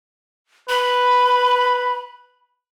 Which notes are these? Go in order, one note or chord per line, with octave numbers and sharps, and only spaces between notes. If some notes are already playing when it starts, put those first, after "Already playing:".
B4 B5